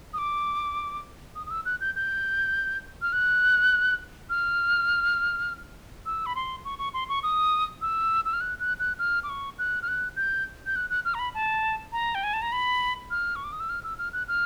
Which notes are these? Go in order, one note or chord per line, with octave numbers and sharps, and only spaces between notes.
D#6
D6
D#6
D#6
E6
F#6
G6
G6
F6
F#6
F6
E6
B5
C6
C#6
C#6
C6
C#6
D#6
E6
E6
F6
F#6
F#6
F#6
F6
D6
C#6
F#6
F6
F#6
G6
G6
F#6
F#6
F6
A#5
B5
A5
A#5
G5
G#5
A5
A#5
B5
F6
C#6
D6
D#6
E6
F6
E6
F6
F#6
F6